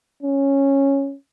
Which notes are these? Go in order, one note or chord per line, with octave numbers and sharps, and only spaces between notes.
C#4